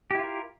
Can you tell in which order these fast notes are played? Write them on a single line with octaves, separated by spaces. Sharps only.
G4 E4 F4 A#4